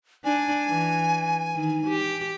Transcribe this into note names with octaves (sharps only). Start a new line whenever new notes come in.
D4 G#5
E3
D#3
G4